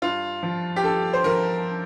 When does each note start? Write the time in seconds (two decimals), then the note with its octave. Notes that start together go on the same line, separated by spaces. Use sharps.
0.02 G2 F4
0.43 F3
0.76 G4
0.83 G2 A4
1.13 C5
1.24 F3 A#4